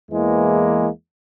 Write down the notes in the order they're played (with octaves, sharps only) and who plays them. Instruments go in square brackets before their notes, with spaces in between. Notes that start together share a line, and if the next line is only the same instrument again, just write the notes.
[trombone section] E2 E3 G#3 A#3